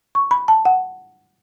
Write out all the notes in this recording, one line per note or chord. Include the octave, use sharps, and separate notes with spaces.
C#6
B5
A5
F#5